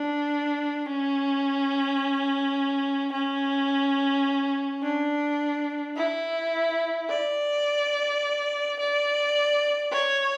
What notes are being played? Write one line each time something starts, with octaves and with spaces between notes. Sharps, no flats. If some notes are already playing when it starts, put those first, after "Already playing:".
Already playing: D4
C#4
C#4
D4
E4
D5
D5
C#5